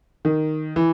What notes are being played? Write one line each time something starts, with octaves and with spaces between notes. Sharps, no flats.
D#3
E3